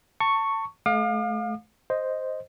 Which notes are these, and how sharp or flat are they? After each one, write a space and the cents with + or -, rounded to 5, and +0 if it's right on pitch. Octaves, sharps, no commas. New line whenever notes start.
A5 +30 C#6 +0
A3 -35 F5 +25 D6 +45
C5 +0 D#5 +0